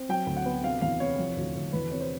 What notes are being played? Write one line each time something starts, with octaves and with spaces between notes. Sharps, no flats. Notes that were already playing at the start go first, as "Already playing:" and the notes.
Already playing: C4
F#3 G5
D2
F#5
B3
C3 F5
E2 F5
C3 C#5
F3
D2
D2
E2 B4
C3 C#5
C5